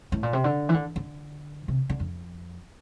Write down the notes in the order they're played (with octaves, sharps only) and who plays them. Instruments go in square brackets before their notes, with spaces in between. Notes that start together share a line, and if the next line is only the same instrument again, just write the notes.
[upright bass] A2
A#2
C3
D3
E3
D3
D3
C3
D3
F2